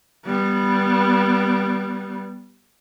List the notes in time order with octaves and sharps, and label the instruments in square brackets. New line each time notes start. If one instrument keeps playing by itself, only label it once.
[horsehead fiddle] G3 B3